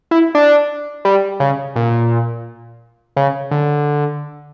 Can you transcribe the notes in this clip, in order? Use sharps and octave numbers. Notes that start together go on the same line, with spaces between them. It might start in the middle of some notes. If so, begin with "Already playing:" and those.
E4
D4
G3
C#3
A#2
C#3
D3